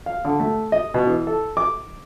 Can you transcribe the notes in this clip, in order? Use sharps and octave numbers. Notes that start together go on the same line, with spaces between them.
F5
D3
A3
D#5
B2
E3
A4
D6